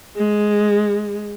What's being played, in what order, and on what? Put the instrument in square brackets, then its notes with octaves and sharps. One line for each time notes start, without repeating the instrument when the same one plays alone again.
[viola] G#3